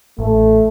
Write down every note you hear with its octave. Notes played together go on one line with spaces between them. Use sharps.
A1 A3